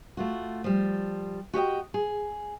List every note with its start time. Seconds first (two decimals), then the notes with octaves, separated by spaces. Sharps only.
0.17 A3 F4 F#4
0.64 F3 G3
1.54 F#4 G4 D#5 G5
1.94 G#4